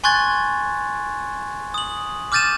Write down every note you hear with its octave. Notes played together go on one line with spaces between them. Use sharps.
G#5 C6 C#6 F#6 G#6 A6
D#6 F#7
D6 F6 G6 A6 D#7 E7